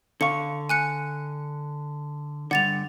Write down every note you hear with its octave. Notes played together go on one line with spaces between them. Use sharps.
D3 F5 C#6 C#7
G#5 F#6 C#7
G2 D3 F#5 A6 F7